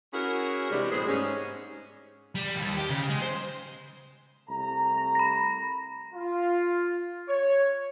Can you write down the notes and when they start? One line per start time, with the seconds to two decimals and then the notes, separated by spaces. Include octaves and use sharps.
0.14 C#4 E4 F#4 G#4 A#4
0.71 C3 E3 G3 G#3 D4
0.92 A2 B3 C4 G#4 C5
1.08 G#2 C#4
2.35 G3
2.56 D#2
2.77 G4
2.89 C#3
3.09 G#3
3.22 C5
4.49 C2 A3 A#5
5.15 B5 A#6
6.14 F4
7.29 C#5